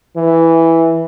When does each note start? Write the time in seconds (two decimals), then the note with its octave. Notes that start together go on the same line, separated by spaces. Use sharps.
0.17 E3